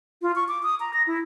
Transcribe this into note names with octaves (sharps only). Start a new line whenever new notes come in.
F4
C#6
D6
D#6
A#5
A#6
E4